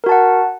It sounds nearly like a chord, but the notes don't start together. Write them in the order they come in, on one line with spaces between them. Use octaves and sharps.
A#4 F#4 A5 F#5